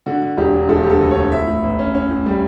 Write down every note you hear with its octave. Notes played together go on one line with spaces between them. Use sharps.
D3 F#4
D3
E1 G4
F#3
E1 A4
D2 G4
A4
D2
D2 C#5
A2 E5
A2
A1
C#4
C#4
A2
G3